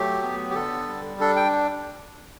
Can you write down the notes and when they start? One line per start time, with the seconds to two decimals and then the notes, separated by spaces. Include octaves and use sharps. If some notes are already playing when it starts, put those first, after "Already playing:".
Already playing: F#3 A3 G4
0.23 B3
0.50 G4
0.55 D3 A4
0.87 G3
1.20 D4 A4
1.36 G5